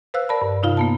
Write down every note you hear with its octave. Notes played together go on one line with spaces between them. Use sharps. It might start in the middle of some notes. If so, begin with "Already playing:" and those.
B4 C5 F5 E6 F#6
A#4 D5 A5 B5
G2
C3 D#4 F4 F5
A#3 B3 A5